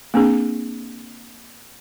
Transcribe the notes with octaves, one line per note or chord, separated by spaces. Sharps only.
A#3 C4 D4 G#4